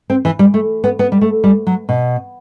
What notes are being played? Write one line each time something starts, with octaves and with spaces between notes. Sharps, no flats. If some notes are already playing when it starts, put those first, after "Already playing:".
C4
E3
G3
A3
B3
B3
G3
A3
G3
F#3
B2